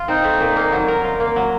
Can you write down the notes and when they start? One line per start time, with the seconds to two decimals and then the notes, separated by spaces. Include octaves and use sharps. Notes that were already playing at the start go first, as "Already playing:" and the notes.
Already playing: F4
0.08 C4 D#4
0.24 A3
0.40 A#2
0.56 A#3
0.72 F#3
0.88 A#4
1.04 F4
1.20 A#3
1.36 F#3